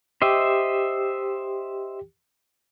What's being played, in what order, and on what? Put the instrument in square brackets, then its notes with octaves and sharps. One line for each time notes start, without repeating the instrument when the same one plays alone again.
[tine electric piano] G4 [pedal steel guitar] C5 D#5 E5